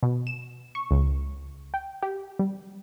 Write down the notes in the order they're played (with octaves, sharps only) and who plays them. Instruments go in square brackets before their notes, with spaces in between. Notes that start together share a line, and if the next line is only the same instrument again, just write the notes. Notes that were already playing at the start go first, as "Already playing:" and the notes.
[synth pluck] B2
E7
C#6
C#2
G5
G4
G3